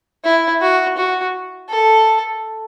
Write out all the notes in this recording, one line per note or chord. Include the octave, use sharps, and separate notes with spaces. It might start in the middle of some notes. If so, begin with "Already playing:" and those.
E4
F#4
F#4
A4